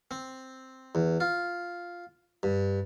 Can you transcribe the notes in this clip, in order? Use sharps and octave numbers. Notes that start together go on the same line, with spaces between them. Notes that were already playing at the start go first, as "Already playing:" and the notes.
C4
E2
F4
G2